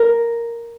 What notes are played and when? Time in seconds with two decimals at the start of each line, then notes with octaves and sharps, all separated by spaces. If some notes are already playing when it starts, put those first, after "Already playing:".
Already playing: A#4